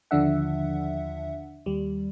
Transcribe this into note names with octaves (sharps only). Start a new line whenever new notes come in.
D#2 D3 F3 D4 E5 F#5
D#2 G3